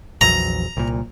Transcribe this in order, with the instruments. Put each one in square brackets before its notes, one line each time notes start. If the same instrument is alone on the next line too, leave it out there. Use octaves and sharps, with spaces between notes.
[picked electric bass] A#1 E2 F#3 [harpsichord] A#5
[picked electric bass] C2 A#2